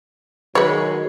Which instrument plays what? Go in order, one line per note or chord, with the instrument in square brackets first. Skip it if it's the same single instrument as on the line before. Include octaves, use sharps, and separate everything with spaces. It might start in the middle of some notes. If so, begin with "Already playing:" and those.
[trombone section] D#3 F#3 [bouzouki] G#3 [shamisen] B4 C#5